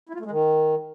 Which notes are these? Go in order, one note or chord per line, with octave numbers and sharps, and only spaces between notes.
E4
F4
A3
G#3
D#3